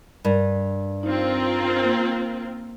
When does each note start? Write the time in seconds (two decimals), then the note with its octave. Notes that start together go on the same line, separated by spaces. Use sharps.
0.25 G2 A#4
1.03 C4 D#4 F4 A#4
1.84 A#3